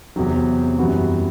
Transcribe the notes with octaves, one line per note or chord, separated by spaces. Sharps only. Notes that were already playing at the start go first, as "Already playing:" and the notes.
E2 C3 F#3 C4
F#2 E3 G3 B3 F#4